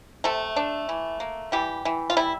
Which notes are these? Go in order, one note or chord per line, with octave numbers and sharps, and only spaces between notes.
C3 A3 A4
D4
E3
A#3
E3 G3 G4
E3
F4
G3 E4